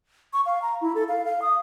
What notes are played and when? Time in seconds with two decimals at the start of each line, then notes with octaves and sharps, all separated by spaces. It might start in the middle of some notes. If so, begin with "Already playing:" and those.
0.33 C#6
0.46 F5
0.62 A#5
0.81 E4
0.95 A4
1.08 F5
1.25 F5
1.42 D#6